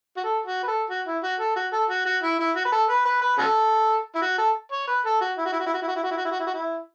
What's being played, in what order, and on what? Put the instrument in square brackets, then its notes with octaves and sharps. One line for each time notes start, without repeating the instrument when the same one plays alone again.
[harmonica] F#4
A4
F#4
B4
A4
F#4
E4
F#4
A4
F#4
A4
F#4
F#4
E4
E4
F#4
B4
A4
B4
B4
B4
C#4 F#4 A4
E4
F#4
A4
C#5
B4
A4
F#4
E4
F#4
E4
F#4
E4
F#4
E4
F#4
E4
F#4
E4
F#4
E4
F#4
E4
F#4
E4